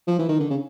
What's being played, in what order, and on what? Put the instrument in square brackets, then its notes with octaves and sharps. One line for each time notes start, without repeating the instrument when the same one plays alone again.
[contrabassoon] F3
E3
D#3
D3
C#3